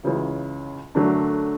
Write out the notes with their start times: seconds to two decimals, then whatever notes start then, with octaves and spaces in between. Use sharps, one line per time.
0.03 C#2 C#3 E3
0.95 F#2 D3 F#3 A3 D4